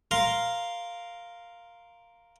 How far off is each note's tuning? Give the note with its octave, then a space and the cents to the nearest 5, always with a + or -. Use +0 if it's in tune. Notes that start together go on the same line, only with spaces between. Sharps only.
A#4 +0 F5 +0 C6 +0